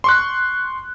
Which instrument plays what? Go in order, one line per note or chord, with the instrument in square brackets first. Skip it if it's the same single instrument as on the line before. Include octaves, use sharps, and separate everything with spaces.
[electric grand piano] C6 C#6 F#6